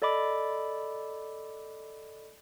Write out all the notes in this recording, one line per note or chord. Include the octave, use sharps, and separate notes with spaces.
A4 D5 D#5 B5 D6